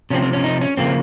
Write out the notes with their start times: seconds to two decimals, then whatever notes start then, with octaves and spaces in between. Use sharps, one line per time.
0.10 C3 F3 C4 C#4
0.23 C4
0.33 C#4
0.44 D#4
0.61 C#4
0.77 C#3 F3 A#3 C4